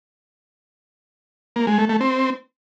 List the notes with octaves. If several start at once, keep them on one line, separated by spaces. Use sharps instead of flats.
A#3
G#3
A3
A3
C4